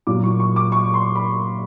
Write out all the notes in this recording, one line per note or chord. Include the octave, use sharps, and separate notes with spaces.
A#2 F#3 A#3 D6
C#6
C#6
D6
C#6
C6
B5